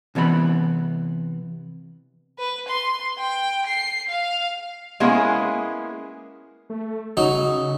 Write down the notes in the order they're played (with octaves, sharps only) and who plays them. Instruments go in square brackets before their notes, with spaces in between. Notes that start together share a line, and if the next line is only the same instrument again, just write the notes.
[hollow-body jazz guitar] C3 E3 B3 C5 B5
[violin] B4
C6
G5
C7
F5
[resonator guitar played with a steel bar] G#3 A#3 B3 C#4 E4 G#4
[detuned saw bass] A3
[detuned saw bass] C#3 [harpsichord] F#3 D#4